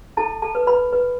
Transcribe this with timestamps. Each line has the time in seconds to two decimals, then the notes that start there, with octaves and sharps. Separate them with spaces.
0.17 E4 A4 A5
0.42 A4 A5
0.55 B4
0.67 B4 B5
0.93 B4